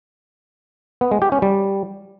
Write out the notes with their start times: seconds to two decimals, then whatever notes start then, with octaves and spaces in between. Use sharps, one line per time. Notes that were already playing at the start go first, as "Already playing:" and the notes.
1.01 B3
1.11 G#3
1.22 G4
1.32 C#4
1.42 G3